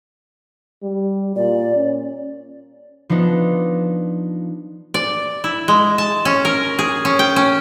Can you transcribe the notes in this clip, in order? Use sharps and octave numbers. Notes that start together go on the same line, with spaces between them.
G3
A#2 D5
C#4
F3 B3 D4 D#4
D5
E4
G#3
A5
C#4
A#4
G#4
C#4
G5
C#4